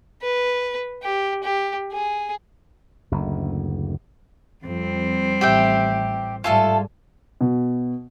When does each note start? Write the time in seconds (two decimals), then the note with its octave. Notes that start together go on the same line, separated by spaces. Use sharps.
0.22 B4
1.02 G4
1.43 G4
1.92 G#4
3.12 F#1 D2
4.65 F2 G3 C4
5.41 A1 G4 E5 G5
6.44 G#2 G3 A3 F4 A4 G#5
7.41 B2